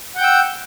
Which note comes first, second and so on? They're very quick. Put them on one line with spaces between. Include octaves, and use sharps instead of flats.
F#5 G6 G5 E6